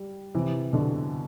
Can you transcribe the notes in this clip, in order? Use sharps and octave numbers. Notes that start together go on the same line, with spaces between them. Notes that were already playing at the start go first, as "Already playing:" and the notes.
Already playing: G3
C3 E3
B2 D3